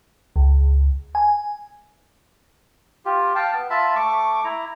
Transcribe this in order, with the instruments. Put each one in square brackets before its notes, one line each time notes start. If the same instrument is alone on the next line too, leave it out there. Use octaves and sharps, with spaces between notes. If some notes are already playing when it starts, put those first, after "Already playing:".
[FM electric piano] C#2
G#5
[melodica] F4 G4
F5 G5 A5
B3
F4 E5 A5 B5
A3 C#6 D6
E4 A#5